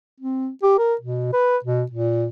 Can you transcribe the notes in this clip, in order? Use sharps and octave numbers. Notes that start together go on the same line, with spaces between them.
C4
G4
A#4
B2
B4
B2
A#2